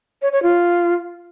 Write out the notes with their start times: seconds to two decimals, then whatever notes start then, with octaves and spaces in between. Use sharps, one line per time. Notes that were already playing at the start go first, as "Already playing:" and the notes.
0.22 C#5
0.32 C#5
0.43 F4